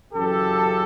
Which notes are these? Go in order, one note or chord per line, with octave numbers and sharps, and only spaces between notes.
F#2 C#3 E3 G4 A4